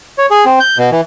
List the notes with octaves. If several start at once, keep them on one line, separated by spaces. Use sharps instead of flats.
C#5
G#4
C4
G6
B2
E3